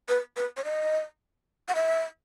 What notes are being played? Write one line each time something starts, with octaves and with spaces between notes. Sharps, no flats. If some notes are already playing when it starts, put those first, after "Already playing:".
B4
B4
C#5
D#5
F#5
E5